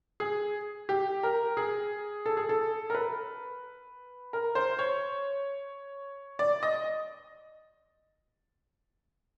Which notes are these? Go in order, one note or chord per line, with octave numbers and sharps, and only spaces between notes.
G#4
G4
A#4
G#4
A4
G#4
A4
A#4
B4
A#4
C5
C#5
D5
D#5